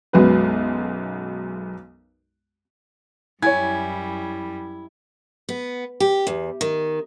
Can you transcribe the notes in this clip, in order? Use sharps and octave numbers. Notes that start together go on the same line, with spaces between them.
B1 F#2 G#3 F#4 B4
F#2 G3 E4 C#5 G#5 G#6
B3
G4
E2
D#3